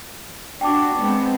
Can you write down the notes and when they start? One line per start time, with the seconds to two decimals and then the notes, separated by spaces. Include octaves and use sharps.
0.61 D4 F#4 G5 A5 D6
0.98 G#3 B3 C4